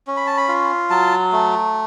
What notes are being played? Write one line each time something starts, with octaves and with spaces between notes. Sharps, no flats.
C#4
B5
A5
B5
F4
F#3 A5
A3